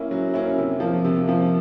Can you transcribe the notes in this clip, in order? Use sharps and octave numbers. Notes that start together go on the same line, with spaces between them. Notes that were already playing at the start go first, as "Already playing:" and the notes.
Already playing: A#3 C#4 E4
F#3
A#3 C#4 E4
C3
F3 A#3
C3
F3 A#3